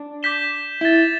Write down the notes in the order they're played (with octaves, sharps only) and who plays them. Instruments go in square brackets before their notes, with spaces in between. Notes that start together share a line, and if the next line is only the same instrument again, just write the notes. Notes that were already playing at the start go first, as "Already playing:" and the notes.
Already playing: [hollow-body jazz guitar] D4
[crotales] D6 G6 B6 E7 G7
[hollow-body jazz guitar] E4 [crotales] A6 E7 G7